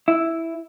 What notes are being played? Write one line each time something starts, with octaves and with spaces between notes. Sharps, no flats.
E4